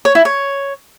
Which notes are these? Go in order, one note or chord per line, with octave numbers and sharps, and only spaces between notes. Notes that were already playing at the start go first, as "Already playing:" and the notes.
C#5
E4
C#5